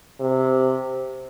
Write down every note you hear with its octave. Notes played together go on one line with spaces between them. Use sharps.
C3